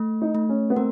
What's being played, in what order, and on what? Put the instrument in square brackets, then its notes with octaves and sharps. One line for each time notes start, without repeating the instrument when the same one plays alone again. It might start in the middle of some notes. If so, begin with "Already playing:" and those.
Already playing: [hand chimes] A3
[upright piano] D#4
[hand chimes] A3
[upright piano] C#4
B3
[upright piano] C4 [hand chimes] A#4